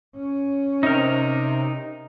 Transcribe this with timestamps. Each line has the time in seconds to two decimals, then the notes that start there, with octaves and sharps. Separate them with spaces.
0.16 C#4
0.83 C3 D#4 A#4